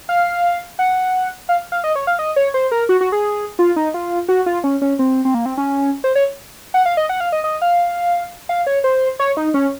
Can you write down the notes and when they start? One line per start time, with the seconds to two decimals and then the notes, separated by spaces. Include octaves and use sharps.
0.09 F5
0.79 F#5
1.49 F5
1.72 F5
1.84 D#5
1.96 C#5
2.07 F5
2.19 D#5
2.36 C#5
2.54 C5
2.72 A#4
2.89 F#4
3.01 F#4
3.12 G#4
3.59 F4
3.76 D#4
3.94 F4
4.29 F#4
4.46 F4
4.64 C#4
4.82 C#4
4.99 C4
5.25 C4
5.34 A#3
5.46 C4
5.57 C#4
6.04 C5
6.15 C#5
6.74 F#5
6.86 F5
6.97 D#5
7.09 F#5
7.20 F5
7.32 D#5
7.44 D#5
7.62 F5
8.49 F5
8.67 C#5
8.84 C5
9.19 C#5
9.37 D#4
9.54 C#4